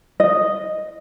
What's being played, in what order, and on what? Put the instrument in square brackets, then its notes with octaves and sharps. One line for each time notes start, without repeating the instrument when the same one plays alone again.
[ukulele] D#5